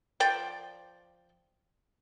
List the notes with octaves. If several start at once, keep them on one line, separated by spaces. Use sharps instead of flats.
F3 D5 G5